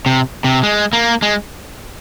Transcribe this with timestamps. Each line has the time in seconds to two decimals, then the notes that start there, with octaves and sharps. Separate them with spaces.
0.06 C3
0.44 C3
0.63 G#3
0.93 A#3
1.22 G#3